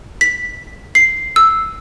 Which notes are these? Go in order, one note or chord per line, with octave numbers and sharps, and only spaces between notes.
B6
C7
E6